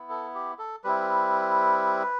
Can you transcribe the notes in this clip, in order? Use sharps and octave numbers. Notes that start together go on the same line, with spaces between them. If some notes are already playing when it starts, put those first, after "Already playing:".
Already playing: B3 E4
A4
G4
A4
G3 C4 E4 B4